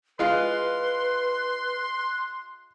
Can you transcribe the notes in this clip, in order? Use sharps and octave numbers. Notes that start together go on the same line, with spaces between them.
G#3 F4 B4 C6 F#6